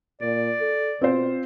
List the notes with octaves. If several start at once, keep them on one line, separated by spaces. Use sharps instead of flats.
A#2 D5
A4
B2 C4 F4 C5